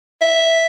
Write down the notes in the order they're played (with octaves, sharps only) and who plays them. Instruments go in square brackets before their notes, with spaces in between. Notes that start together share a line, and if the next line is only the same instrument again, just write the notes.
[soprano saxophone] E5